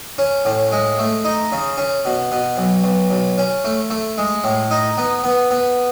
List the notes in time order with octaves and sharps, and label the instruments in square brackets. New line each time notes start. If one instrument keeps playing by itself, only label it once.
[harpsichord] C#4
A2
G#3
A3
D#4
C#3
C#4
B2
B2
B1
B1
B1
C#4
A3
A3
G#3
A2
D#4
B3
B3
B3